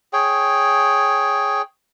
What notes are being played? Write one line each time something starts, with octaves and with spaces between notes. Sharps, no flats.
G#4 C#5 G5